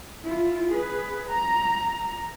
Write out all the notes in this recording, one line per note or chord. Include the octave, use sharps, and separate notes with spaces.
E4 F4
G#4 B4
A#5